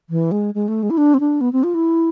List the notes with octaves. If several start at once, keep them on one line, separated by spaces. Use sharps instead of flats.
E3
G#3
G#3
A3
G#3
E4
D4
C4
D4
B3
C4
F4
E4